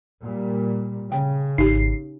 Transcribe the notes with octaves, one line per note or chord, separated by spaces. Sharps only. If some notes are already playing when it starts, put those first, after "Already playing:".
A#2 G3
C#3 G5
G#1 D#4 G4 C7